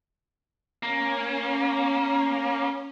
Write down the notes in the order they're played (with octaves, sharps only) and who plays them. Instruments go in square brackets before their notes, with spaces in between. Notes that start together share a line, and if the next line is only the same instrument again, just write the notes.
[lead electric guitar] A#3 [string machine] C#4